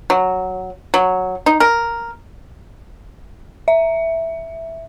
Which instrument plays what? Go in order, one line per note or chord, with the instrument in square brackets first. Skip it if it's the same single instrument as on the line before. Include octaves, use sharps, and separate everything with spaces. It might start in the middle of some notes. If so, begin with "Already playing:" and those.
[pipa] F#3
F#3
D#4
A#4
[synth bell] E5